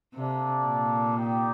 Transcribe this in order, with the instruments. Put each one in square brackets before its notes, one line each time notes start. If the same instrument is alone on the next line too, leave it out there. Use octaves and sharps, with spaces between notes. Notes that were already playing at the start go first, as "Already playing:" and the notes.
[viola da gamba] C3 [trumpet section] A#3 D4 A4 D5
[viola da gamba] A#2
[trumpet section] D#4 G4 D5 G5